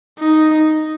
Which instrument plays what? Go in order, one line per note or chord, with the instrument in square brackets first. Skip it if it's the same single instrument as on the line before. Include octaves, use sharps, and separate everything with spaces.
[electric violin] D#4